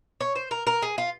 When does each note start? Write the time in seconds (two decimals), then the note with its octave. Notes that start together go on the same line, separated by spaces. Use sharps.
0.21 C#5
0.36 C5
0.51 A#4
0.67 A#4
0.82 G#4
0.98 F4